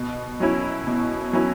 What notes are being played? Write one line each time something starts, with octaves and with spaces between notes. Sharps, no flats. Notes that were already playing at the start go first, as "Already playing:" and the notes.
Already playing: B2
F#3 C#4 E4
B2
F#3 C#4 E4